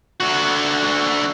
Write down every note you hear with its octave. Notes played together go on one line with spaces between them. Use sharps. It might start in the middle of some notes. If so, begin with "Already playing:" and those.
D3 F#4